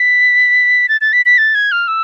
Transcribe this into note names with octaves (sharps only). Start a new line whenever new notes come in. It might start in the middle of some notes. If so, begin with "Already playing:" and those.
Already playing: B6
A6
A6
B6
B6
A6
G#6
F6
E6